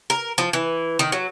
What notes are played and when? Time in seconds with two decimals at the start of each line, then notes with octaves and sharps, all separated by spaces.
0.10 A#4
0.38 F3
0.53 E3
0.99 D#3
1.12 F#3